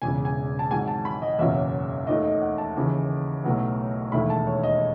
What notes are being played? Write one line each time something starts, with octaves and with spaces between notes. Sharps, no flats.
E1 E2 C#3 G#5
G#5
A5
G#1 G#2 F#3 G#5
A5
B5
D#5
F#1 E2 B2 F#3 C#4 E5
D#2 D#3 A3 D#5
D#5
F#5
A5
D#2 C#3 E3
B1 A2 F#3 B3
E1 D#2 D#3 A3 E4 B5
A5
C#5
D#5